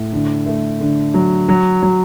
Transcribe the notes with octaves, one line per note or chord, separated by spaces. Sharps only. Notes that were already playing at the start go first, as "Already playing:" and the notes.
Already playing: A2
D3
A3
D3
F#3
F#3
F#3